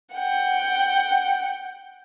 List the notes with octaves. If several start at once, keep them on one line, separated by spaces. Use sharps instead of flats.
F#5 G5